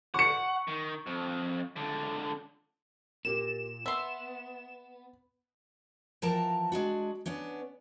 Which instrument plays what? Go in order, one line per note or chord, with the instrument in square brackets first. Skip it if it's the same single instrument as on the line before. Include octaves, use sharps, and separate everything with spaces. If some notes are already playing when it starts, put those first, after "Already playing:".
[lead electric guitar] F#5 [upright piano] C#6 C#7
[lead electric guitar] D#3
F2
C#2 D3
[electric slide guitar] A#2 [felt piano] G4 A#4 [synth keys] E7
[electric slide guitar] B3 [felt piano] B4 [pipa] E5 C6
[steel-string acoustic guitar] E3 F3 A#4 G5 A5 A#5
G#3 D4 F#4
B3 C#4 D4